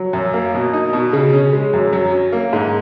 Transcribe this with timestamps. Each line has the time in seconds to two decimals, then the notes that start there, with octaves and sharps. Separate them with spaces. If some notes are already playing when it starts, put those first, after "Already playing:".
Already playing: F#3
0.13 F#2
0.34 A#3
0.54 B2
0.73 D#4
0.93 B2
1.13 C#3
1.33 C#4
1.53 G#3
1.73 F#2
1.93 F#3
2.12 C#4
2.33 A#3
2.53 G#2